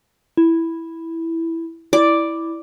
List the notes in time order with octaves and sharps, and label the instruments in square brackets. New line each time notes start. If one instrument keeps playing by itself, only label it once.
[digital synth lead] E4
[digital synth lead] E4 [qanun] D5